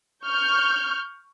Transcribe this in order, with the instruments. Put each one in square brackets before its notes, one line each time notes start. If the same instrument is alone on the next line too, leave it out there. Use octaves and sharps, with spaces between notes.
[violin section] C#6 F6 G6